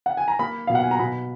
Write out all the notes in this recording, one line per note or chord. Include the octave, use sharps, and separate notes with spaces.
F#5
G#5
A#5
A#3 B5
B2 F5
F#5
G#5
A#5
B2 B5